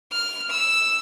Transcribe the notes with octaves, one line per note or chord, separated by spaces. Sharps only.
F6
E6